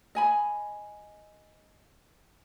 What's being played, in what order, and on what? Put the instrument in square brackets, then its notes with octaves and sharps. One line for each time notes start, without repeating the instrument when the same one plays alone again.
[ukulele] D#5 G#5 B5